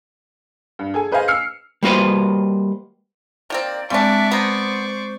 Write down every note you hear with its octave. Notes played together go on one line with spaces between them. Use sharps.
G2
G#4 A4 G#5
G#4 B4 C5 D#5 F5 G#5
E6 F6 C7 C#7
G3 A#3 F#4 B4 C5
D#3 A#3 C4 D5
G3 G#3 C4 D4 D5 E5 F5 C#6
B3 C5 A#5